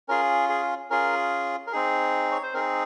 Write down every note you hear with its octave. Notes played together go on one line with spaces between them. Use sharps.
C#4 F4 G#4 A#4
G#4
C#4 F4 G#4 A#4
A#4
C4 D#4 G#4
C#5
C5
C4 D#4 G#4 A#4